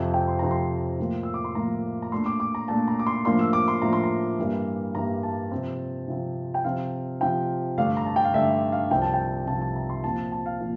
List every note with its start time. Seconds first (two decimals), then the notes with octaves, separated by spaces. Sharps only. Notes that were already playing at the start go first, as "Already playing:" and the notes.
Already playing: F2 C3 F3 C4
0.14 G5
0.28 C6
0.39 F2 C3 F3 C4 A#5
0.51 C6
0.99 A2 F3 A#3
1.23 E6
1.34 D6
1.44 C6
1.55 A2 F3 A#3 A#5
2.02 A#5
2.12 A#2 A3 D4 C6
2.26 D6
2.40 D6
2.55 A#5
2.68 A#2 A3 D4 A5
2.88 A#5
2.99 D6
3.07 C6
3.25 A2 F3 A#3 D4 C6
3.39 E6
3.53 D6
3.68 C6
3.82 A2 F3 A#3 D4 A#5
3.93 C6
4.03 A#5
4.39 G2 E3 G3 A#3
4.95 G2 E3 G3 A#3 A#5
5.23 A5
5.51 C3 F3 C4
6.08 C3 F3 C4
6.54 G5
6.64 C3 F3 C4 F5
7.21 C3 F3 C4 G5
7.77 G2 D3 A3 D4 F5
7.97 A#5
8.06 A5
8.16 G5
8.24 F5
8.34 G2 D3 A3 D4 E5
8.72 F5
8.90 C2 C3 F3 C4 G5
9.02 A5
9.14 G5
9.47 C2 C3 F3 C4 A5
9.61 A5
9.76 A#5
9.90 C6
10.04 A#2 F3 C4 A5
10.32 A5
10.46 F5
10.61 A#2 F3